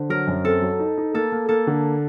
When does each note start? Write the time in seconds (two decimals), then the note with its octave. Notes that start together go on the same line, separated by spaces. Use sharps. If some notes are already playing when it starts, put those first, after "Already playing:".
Already playing: D3 C5
0.09 F#3 A#4
0.27 F#2
0.44 C4 A4
0.62 F#3
0.79 D#4
0.97 D#4
1.14 A#3 A4
1.32 A#3
1.49 A#3 A4
1.67 D3